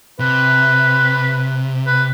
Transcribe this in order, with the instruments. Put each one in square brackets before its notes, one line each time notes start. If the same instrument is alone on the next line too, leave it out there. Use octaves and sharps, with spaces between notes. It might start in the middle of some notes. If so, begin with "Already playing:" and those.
[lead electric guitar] C3 [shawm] B4
[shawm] B4